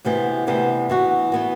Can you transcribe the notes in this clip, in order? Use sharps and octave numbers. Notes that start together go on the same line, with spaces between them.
D2 C3 E3 B3
D2 C3 E3 B3
E3 B3 F#4
E3 B3 F#4